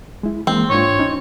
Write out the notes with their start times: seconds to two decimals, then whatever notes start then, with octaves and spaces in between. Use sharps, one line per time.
0.23 G#3 E4
0.47 E3 G#3 A#3 C4
0.70 G#2 D4 F4 C#5
0.99 C#4 D#4